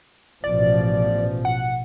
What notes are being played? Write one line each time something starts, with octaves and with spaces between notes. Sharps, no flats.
A1 B2 F3 D5
F#5